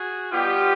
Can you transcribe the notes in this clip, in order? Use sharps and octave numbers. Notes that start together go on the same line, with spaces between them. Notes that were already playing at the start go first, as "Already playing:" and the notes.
Already playing: F#4 G#4
B2 G3 B3 F4 G4